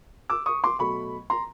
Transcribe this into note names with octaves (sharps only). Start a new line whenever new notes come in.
D6 E6
C#6 D#6
C6 D6
B2 F#3 A3 B5 C#6
A#5 C6